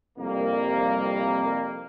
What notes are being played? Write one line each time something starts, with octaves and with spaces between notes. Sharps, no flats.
C2 F2 G3 A#3